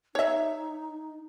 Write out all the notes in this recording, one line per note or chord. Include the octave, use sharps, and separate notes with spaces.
D#4 C#5 E5